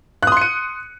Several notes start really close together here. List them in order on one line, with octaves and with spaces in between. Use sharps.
F#6 D#6 C6 C#7 D#7